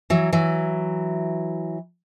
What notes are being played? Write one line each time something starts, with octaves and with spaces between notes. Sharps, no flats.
E3 F#3
E3 F#3